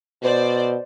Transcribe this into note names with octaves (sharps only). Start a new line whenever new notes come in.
B2 C5 D5